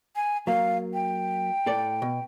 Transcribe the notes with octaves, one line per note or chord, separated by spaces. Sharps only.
G#5
F#3 A#3 F5
G5
A2 A4 D5
B2